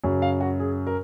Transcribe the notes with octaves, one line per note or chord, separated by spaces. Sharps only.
F#2 C#3 F#3
F5
F#4
G#4
A#4